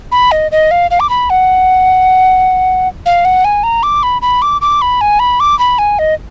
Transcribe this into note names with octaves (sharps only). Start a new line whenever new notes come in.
B5
D#5
D#5
F5
F5
D6
B5
F#5
F5
F#5
G#5
A#5
D6
B5
B5
D6
D6
B5
G#5
B5
D6
B5
G#5
D#5